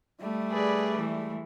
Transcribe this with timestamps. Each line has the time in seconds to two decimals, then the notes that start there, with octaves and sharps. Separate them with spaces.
0.20 G3 A3
0.50 G#4 B4 D5
0.98 E3 G#3